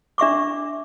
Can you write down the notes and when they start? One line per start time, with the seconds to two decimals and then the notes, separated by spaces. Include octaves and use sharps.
0.18 D4 E5 C#6 D6